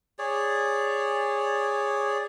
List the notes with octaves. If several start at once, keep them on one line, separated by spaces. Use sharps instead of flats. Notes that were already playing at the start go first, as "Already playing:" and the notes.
G#4 C#5 D5